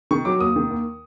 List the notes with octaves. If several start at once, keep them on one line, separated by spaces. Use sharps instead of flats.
D#3 C#6
F#3 D6
D#2 D#6
D#3
D#2